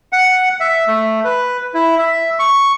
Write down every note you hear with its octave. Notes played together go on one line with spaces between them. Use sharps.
F#5
E5
A3
B4
E4
E5
C#6